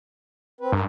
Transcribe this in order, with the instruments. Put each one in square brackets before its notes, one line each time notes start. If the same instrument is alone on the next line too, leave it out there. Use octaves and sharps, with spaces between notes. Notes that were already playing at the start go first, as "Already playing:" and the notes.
[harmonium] C4 B4
[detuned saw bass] G2 [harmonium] A#4